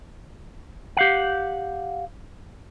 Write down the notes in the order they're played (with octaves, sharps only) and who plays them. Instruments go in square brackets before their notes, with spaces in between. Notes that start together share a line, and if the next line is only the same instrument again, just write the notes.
[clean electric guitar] G4 F5 F#5